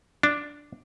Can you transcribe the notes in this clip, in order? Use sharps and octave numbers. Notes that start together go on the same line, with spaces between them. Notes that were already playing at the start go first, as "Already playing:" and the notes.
D4